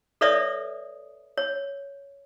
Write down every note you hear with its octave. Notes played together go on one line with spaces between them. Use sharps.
A4 B4 C#5 D5 E5 D#6
C#5